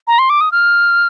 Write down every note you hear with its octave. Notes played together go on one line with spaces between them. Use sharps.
A#5
C6
D6
D#6
F6